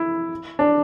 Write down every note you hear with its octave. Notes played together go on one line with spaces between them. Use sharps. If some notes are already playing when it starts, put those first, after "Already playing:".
Already playing: E4
D4